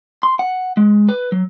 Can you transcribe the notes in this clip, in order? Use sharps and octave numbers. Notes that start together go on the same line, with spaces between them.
C6
F#5
G#3
B4
F#3